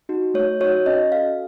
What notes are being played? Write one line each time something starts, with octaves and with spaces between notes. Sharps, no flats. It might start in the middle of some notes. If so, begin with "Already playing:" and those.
D#4 F#4
A3 C#5
D#4 F#4 C#5
C#4 D#5
F#4 A4 F5